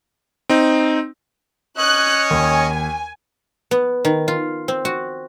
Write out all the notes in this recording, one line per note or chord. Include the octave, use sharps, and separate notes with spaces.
C4 D#4
C#4 C#5 D#5 F#6
D#2 G#5
B3
D#3
F4
C4
F#4